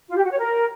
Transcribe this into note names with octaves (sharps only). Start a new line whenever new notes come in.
F4
G4
F#4
C#5
A#4